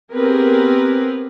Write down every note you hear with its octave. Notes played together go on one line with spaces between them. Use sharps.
B3 C4 G4 G#4 A#4 B4